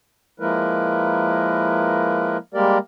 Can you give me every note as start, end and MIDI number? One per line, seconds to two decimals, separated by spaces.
0.40 2.37 53
0.40 2.37 56
0.40 2.37 58
0.40 2.37 64
0.40 2.37 70
0.40 2.37 71
2.54 2.78 55
2.54 2.78 56
2.54 2.78 58
2.54 2.78 67
2.54 2.78 70
2.54 2.78 74